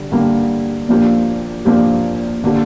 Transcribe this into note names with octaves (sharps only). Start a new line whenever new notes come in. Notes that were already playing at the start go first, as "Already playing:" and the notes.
Already playing: D3 G3
D3 G3 A#3
A#2 F3 A#3 D4 G4
A#2 F3 A#3 D4 G4
D3 A#3 G4